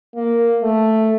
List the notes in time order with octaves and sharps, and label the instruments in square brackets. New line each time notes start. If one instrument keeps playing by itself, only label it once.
[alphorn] A#3
A3